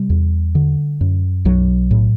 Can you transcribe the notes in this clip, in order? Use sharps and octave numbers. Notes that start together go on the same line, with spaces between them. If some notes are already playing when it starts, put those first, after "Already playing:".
Already playing: C3 G3
E2
D3
F#2
B1 F#3
A2